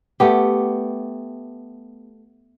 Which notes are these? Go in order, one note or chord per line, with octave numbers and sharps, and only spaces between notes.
A3 B3 G4